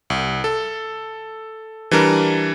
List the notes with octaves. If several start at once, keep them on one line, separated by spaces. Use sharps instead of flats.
C2
A4
E3 G3 D4 A#4